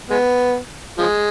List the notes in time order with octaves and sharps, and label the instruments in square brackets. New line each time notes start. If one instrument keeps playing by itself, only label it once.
[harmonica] G#3 B3
F3 G#3